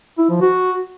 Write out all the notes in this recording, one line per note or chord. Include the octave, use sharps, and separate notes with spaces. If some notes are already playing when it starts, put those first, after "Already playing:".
E4
F3
F#4